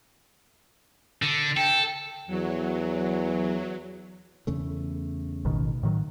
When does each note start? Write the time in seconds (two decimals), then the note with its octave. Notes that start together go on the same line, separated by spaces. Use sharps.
1.22 D3
1.57 A4 G5
2.27 E2 F#3
4.47 E2 C#3 A3
5.45 A1 B2 D#3
5.83 A2 D#3 F#3